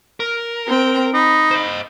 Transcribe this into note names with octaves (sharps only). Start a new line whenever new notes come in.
A#4
C4 G5
D#4 B5
C5 D#5